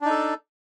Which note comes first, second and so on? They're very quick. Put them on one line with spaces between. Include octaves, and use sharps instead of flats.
D4 D#4 A4